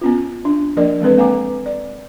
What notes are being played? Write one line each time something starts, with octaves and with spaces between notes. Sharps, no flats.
B3 C#4 F4
D4
F3 A#3 D4 A#4 D5
E3 G#3 C4 A4 B4
A#3 F5 G#5 A#5 D6
D5